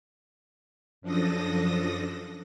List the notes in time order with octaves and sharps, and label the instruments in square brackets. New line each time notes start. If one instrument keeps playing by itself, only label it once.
[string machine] F#2 F3 D4 A4 D#6 A#6